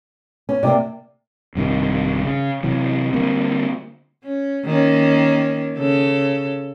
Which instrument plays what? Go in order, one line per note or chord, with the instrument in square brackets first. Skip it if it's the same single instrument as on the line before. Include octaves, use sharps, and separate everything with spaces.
[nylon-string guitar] C#4
[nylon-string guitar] C3 G3 A#3 [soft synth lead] D5
[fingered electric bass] A#1 G2 C3 D#3
C#3
C3 E3 F#3
D3 G3 A#3 C4
[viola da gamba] C#4
D#3 A#3 C#4
C#3 A4